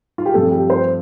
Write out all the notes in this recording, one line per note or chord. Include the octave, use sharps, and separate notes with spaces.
F4
G4
G2 F3 A3 C4 A4
G4
C5